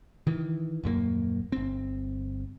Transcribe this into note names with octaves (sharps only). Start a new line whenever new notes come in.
D#3 E3
D#1 F#2 G3 A#3
G1 C4